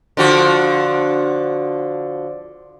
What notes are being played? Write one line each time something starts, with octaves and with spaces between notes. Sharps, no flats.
D3 F3 F#4